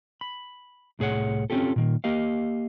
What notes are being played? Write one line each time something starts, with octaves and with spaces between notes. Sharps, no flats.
B5
C2 A2 G#4 C#5 F#5
C4 C#4 F4 G4 A4
A#2 D#3 A#3
A#3 G4 D#5 F5